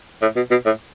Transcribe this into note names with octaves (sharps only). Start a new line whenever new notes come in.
A2
B2
B2
A2